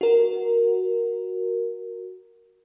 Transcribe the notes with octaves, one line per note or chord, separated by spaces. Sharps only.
F#4 A#4